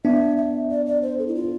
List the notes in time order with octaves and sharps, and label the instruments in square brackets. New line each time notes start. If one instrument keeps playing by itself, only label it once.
[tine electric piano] B3 D4 [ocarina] E5
[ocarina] E5
D5
D5
C5
A4
E4
F4